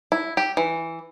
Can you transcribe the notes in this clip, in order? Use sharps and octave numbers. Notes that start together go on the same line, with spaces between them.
E4
G4
E3